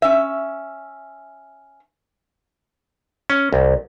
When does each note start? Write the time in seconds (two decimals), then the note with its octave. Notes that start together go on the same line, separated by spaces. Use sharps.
0.02 C#4 E5
3.30 C#4
3.53 C2